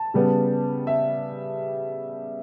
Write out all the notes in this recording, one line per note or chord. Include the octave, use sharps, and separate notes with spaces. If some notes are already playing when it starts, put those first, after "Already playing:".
Already playing: A5
C#3 G3 B3
E5